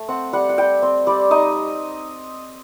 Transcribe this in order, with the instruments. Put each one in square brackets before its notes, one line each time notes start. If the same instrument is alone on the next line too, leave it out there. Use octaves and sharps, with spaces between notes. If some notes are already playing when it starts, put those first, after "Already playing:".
Already playing: [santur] A3
C4 F#5
G3 F#5
F#5
G3 G5
C4
G3 D5
D#4 D#5